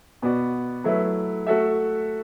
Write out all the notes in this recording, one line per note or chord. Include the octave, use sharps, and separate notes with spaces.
B2 B3 F#4 D5
F#3 A3 E4 B4
A3 F#4 A4 E5